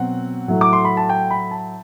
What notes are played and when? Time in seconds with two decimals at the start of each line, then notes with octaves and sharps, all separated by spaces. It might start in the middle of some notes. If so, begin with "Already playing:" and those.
Already playing: B2 F#3 C4 F#5
0.48 A2 F#3 A3
0.61 D6
0.73 C6
0.85 B5
0.97 A5
1.09 G5
1.31 B5
1.51 A5